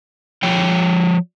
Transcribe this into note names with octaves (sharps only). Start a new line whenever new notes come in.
F3 C#5 G5